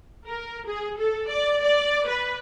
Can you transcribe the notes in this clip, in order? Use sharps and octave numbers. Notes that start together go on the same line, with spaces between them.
A#4
G#4
A4
D5
D5
B4